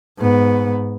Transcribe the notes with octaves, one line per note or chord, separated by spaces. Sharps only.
G#2 B3